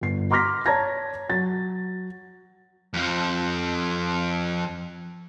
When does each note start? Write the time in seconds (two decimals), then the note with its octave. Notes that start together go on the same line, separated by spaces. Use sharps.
0.01 G1 C7
0.31 A#5 C6 D6 F6 A#6 B6
0.66 C#5 A5 A#5 G#6 A#6
1.29 F#3 A6
2.94 F2 F3